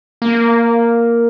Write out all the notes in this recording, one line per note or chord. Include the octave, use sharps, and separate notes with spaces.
A#3